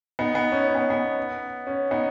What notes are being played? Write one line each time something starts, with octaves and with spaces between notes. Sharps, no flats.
B3 D#4
B3
C#4
C#4
B3
B3
C#4
B3 D#4